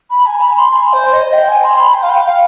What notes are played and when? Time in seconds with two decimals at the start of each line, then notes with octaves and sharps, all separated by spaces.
0.10 B5
0.26 G#5
0.42 B5
0.57 C6
0.73 G#5
0.93 C5
1.13 D#5
1.33 G5
1.48 G#5
1.64 C6
1.79 B5
1.94 G5
2.03 F5
2.10 G5
2.25 F5